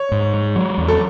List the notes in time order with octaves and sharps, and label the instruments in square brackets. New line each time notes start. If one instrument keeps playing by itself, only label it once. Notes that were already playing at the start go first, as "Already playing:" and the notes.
Already playing: [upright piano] C#5
[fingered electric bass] G#2
G#3
F#3
E2
[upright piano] A4